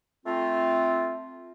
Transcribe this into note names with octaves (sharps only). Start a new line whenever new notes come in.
A3 C4 F4